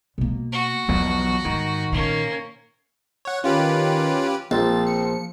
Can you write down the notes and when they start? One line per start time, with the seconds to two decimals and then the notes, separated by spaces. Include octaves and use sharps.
0.18 B2 A#3
0.52 F#4
0.88 B1 E2 F3 B3
1.45 G#2 D#3
1.92 A#2 A#3 C#4
3.25 C#5 F#5
3.44 D#3 C#4 F4 G4 B4
4.51 A#1 F3 C4 A6
4.87 C#7